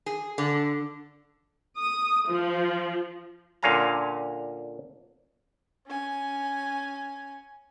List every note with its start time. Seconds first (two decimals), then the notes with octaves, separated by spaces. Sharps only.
0.06 G#4
0.38 D3
1.78 D#6
2.30 F3
3.63 A#2 D3 C#4 F5 G#5 A#5
5.87 C#4 G#5